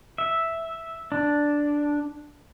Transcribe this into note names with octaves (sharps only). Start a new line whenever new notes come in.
E5
D4